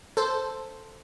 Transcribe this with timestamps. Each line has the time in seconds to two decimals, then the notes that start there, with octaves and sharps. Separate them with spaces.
0.17 A4 C5